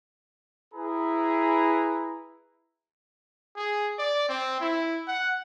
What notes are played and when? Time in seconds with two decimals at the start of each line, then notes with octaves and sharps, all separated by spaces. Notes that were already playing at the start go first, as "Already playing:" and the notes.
0.73 E4 G#4 B4 A#5 B5
3.56 G#4
3.98 D5
4.29 C4
4.60 E4
5.08 F#5